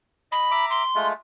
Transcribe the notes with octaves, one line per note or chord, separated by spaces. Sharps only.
D#5 B5
E5 A#5 D6
C6
G#3 A3 F4